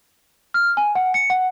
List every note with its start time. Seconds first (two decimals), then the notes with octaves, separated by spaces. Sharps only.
0.54 F6
0.77 G#5
0.95 F#5
1.14 C#7
1.30 F#5